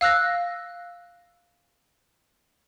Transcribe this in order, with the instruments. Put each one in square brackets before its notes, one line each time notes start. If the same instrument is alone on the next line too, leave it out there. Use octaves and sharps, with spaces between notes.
[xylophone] F5 E6 F#6 A#6